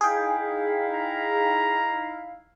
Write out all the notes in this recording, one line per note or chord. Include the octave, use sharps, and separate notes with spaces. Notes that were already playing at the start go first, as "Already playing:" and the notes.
D#4 E4 G#4 F5 G5
A#5